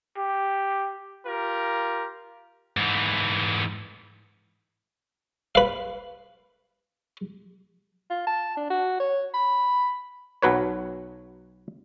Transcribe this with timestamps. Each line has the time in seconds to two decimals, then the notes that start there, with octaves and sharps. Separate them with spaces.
0.17 G4
1.26 F4 G4 A#4
2.77 G#2 E3
5.55 B4 F5
8.10 F4
8.27 A5
8.57 D4
8.70 F#4
9.00 C#5
9.34 B5
10.42 B1 F#3 B4 C#5